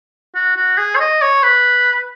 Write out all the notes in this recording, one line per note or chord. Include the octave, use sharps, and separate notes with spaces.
F#4
F#4
G#4
C#5
D#5
C#5
B4